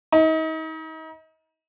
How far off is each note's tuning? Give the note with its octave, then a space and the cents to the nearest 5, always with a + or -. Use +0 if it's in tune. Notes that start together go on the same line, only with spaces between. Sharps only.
D#4 +35